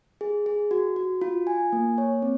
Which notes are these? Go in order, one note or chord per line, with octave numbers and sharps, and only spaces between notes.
G#4
G#4
F#4
F#4
F4
G#5
A#3
C#5
C4